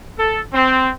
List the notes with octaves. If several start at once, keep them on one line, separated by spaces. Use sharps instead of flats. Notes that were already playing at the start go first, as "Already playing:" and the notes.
A4
C4